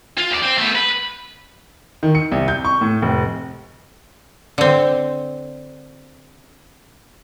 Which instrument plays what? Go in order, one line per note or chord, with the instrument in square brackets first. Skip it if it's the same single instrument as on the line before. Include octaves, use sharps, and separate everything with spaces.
[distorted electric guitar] F4
E2 D5
C4
A3 B3
B4
[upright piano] D#3
C#7
C2
G6
C#6
A2
F1
[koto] D3 C4